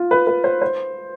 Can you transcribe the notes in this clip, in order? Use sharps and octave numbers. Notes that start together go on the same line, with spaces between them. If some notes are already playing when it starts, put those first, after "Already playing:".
Already playing: F4
B4
B4
C5
C5